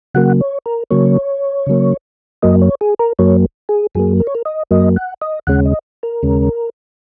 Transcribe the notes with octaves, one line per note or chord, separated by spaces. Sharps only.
C#3 F#3 A#3 F#5
C#5
A#4
C#3 F#3 A#3 C#5
C#3 F#3 A#3
F#2 F#3 A#3 D#5
C#5
G#4
A#4
F#2 F#3 A#3 C#5
G#4
F#2 F#3 A#3 G#4
A#4
C#5
A#4
D#5
F#2 F#3 A#3 D#5
F#5
D#5
D#2 C#3 G#3 C#4 F#5
D#5
A#4
D#2 C#3 G#3 C#4